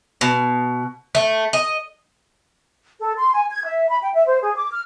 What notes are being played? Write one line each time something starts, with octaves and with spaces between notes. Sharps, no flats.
B2
A3
D#5
A4
C6
G#5
G#6
E5
B5
G5
E5
C5
G#4
D6
F6